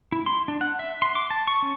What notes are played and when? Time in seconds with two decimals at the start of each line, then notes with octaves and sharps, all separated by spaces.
0.12 E4
0.26 C6
0.48 D4
0.61 F#5
0.79 E5
1.02 C6
1.15 D6
1.31 A5
1.47 C#6
1.62 C#4